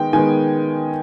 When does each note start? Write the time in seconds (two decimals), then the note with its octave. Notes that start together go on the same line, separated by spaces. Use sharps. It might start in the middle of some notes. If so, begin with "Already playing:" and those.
Already playing: D#3 G#3 B3 G5
0.13 D#3 G#3 B3 G#5